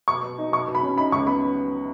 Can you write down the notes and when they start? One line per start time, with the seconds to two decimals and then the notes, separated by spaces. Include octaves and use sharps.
0.08 B2 C#6
0.23 B2
0.38 D#4
0.52 B2 C#6
0.68 B2
0.75 B5
0.83 C#4
0.98 D#4 B5
1.12 C#2 C#6
1.27 B3 B5